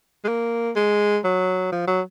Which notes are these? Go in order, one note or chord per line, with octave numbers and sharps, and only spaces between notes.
G#3
A#3
G#3
F#3
F3
F#3